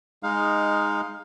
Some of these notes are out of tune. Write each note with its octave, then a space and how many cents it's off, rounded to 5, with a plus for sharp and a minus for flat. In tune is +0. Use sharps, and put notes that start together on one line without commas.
G#3 -5 D#4 +0 F5 +15